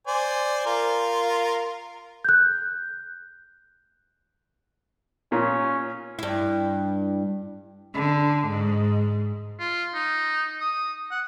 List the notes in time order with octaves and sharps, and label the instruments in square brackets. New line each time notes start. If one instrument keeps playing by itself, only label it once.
[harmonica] C5 D5 G#5
F4 A#4
[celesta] F#6 G6
[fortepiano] A#2 [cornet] C#4
[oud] G2 E4
[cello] D3
G#2
[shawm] F4
D#4
D#6
F#5